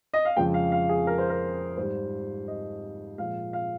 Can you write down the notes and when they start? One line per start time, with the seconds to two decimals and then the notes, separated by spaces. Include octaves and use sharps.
0.14 D#5
0.25 F5
0.37 F2 C#3 F3 G#3 G5
0.54 F5
0.72 F5
0.89 G#4
1.07 A#4
1.18 C5
1.29 A#4
1.77 G#2 G3 C5
2.48 D#5
3.18 A#2 F3 G#3 F5
3.53 F5